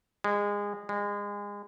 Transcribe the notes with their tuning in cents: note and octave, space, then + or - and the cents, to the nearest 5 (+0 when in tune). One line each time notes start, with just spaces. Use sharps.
G#3 -25
G#3 -30